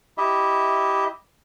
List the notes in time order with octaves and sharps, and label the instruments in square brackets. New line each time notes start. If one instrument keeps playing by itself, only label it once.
[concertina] E4 G4 D#5 E5